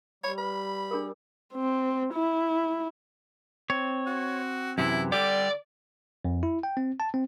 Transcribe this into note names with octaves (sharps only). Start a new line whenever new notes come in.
G3 C#5 B5
B4 B5
D4 G#4 A#4
C4
E4
C4 C#5
F#4
F#2 C3 E3 E4
D3 G3 G4 D5
F2
E4
G5
C4
A5
C4